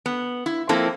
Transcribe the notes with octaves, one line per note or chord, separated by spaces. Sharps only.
B3
E4
F3 A#3 C4 E4 A4